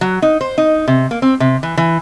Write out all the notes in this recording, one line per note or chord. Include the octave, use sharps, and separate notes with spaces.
F#3
D#4
C5
D#4
C3
A#3
C4
C3
E3
E3